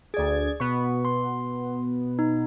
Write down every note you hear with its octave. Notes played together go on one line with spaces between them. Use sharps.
D2 G#4 D5 G#6
B2 B3 C#6
C6
D#4